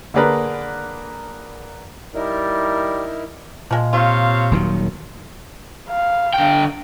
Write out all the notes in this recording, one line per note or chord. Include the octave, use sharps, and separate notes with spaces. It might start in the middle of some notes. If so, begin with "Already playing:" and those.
D3 A#3 D4 G#4 A#4 B4
G3 D#4 E4 A#4
A#2 F3 G#3
C3 F4 C#5 F5
D#1 D#3 F#3
F5
D3 G5